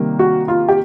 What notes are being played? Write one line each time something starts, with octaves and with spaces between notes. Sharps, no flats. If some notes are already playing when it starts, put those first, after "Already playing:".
Already playing: C3 D#3 G3 A#3
F#4
F4
G4